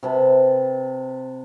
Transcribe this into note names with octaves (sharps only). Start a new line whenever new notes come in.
C3 B4 A5